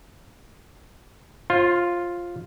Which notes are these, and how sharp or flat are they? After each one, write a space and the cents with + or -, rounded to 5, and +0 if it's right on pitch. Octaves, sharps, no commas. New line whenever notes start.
F4 +0 C5 +40